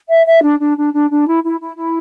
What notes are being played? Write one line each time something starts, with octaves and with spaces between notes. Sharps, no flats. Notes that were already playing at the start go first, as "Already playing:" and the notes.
E5
E5
D4
D4
D4
D4
D4
E4
E4
E4
E4